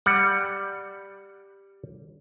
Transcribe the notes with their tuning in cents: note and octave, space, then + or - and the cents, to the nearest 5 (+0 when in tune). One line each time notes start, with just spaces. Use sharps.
G3 +5 F#5 +0